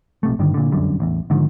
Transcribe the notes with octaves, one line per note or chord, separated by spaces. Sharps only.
A#1 C3 A3
G2 D3 D#3 D4
A#2 D3
F1 C2 F#2 D3
A1 E2
G#2 D3 D#3 F3